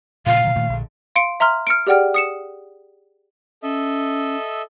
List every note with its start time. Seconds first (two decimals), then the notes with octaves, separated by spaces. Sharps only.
0.26 A#2 C#3 F3 F5
0.44 B2 D#3 F#3
0.56 A#2 D#3 A3
0.69 A#1 D3
1.16 F5 C6 C#7 D7
1.40 E5 A#5 C6 F6
1.67 F6 C#7 D7
1.87 G4 G#4 D5 F#5 G5 F6
2.14 D#6 C#7 E7
3.63 C#4 A4 D#5 E5